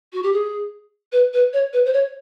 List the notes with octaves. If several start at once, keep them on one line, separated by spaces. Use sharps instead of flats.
F#4
G4
G#4
B4
B4
C#5
B4
C5
C#5